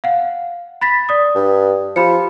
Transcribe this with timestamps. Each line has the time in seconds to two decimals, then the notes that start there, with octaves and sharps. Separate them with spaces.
0.04 F5 F#5
0.81 B5 A6 B6
1.09 D5 D#6
1.35 G2
1.96 F3 G4 B5 C#7